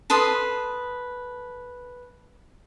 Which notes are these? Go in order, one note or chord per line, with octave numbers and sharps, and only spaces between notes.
A4 B4 C6 D#6